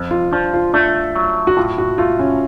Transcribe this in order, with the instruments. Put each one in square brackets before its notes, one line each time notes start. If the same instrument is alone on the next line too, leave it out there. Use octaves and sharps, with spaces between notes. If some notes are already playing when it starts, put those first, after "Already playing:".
Already playing: [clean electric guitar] F2
[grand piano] F4
[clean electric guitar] F3 [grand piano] D4
[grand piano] F4
[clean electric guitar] A3 [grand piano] D4
[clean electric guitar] F#3
[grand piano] F#4
[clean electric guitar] A2 [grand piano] F4
[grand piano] F#4
[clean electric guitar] A3 [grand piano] F4
[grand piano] C#4